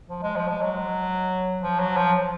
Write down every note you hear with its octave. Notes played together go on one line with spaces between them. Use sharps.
F3
G#3
F3
G#3
F#3
F3
F#3
F3